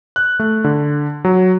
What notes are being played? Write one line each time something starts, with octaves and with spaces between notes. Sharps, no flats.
F#6
A3
D3
F#3